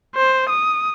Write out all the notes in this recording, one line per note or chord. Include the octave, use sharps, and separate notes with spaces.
C5
D#6